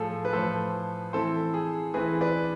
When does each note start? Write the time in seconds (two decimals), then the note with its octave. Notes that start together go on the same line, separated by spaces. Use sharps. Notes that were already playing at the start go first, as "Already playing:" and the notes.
Already playing: A2 F3 A3 G#4 A4
0.25 B4
0.33 A2 F3 A3 A4 C5
1.13 E3 A3 C4 E4 A4 C5
1.54 G#4
1.94 E3 A3 C4 E4 G#4 B4
2.21 B4 D5